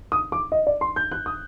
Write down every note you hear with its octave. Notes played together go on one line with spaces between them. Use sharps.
D#6
D6
D#5
D5
C6
G6
F#6
D#6